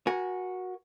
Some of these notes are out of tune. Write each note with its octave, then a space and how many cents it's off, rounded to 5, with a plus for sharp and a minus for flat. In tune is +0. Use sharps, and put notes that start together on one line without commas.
F#4 -10 A#4 +30 G#5 -5